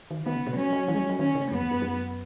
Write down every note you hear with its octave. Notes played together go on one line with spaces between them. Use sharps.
D#3
D#3 B3
C#3
B2
F#3 C#4
F#3
E3
G#3
F#3
F#3
D#3 C#4
C#3
F#2 B3
E2
F#2
F#2